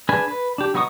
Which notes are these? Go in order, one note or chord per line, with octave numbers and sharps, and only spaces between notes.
D4 G#4 B4 G#5
B4
D4 G4
F#3 B3 D#4 C#6 D#6